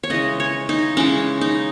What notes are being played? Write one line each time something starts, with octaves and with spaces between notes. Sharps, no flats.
C#5
C#3 E3 G#3 D#5
C#5
D#4
C#3 E3 G#3 C#4
D#4